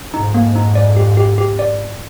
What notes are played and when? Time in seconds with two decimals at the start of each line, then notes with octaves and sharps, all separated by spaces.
0.14 F2 G#2 D#4
0.34 A#3
0.55 D#4
0.75 D5
0.97 G4
1.17 G4
1.38 G4
1.59 D5